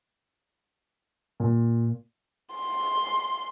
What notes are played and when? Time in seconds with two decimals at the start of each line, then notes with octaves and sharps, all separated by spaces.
1.40 A#2
2.55 C6